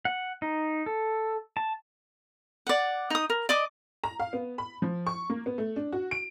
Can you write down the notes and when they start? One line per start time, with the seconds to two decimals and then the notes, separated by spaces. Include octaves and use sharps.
0.05 F#5
0.42 D#4
0.86 A4
1.57 A5
2.67 D5 F#5
3.10 D#4 D#6
3.30 A#4
3.49 D5 D#5 D6
4.04 A#5
4.20 F5
4.33 B3
4.58 B5
4.82 F3
5.07 C#6
5.30 A#3
5.46 B3
5.58 A3
5.76 D4
5.92 F#4
6.11 D7